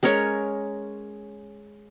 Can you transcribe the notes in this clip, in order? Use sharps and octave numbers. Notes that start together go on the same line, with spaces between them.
G#3 C#4 A#4 C#5